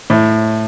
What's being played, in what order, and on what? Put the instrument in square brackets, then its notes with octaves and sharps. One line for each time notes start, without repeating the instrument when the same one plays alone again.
[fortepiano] A2